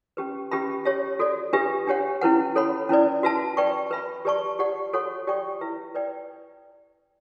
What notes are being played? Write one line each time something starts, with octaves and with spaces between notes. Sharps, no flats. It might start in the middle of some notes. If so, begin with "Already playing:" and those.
C#4 G4 B4
C#4 G4 B4 E5 B5
G4 C#5 E5
F#4 A4 D5
D4 G4 B4 E5
D4 G4 C#5 F#5
C#4 E4 B4 F#5
A4 C#5 F#5 B5
C#4 E4 B4 D5
F#4 B4 E5 A5
B4 D5 G5 C#6
B4 E5 B5
G4 B4 D5 A5 C#6
G4 D5 F#5 C#6
F#4 A4 C#5 F#5 C#6
G4 D5 G5 C#6
E4 B4 E5
B4 D5 G5